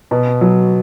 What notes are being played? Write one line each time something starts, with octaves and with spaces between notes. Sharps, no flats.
B2
F#3